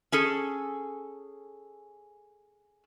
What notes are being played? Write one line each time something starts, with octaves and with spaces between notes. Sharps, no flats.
C#4 G#4 A4